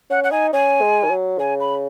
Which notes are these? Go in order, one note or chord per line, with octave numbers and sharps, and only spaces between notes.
C#4 F#5
F#5
D#4 G#5
C#4 G#5
G#3
D#3
F#3
C#3 G#5
B5